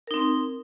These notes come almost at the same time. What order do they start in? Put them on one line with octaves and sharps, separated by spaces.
A#4 D#4 C4